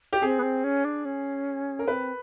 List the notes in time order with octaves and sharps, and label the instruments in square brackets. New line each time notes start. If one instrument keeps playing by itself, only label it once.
[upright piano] G4
[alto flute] C4 [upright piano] G#4
[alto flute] B3
C4
C#4
D4
C#4
[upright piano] A#4
[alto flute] C4 [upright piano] B4